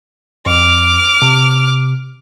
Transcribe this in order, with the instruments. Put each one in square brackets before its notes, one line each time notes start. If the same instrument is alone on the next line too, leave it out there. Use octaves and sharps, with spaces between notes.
[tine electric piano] F2 [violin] D6 F6
[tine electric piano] C3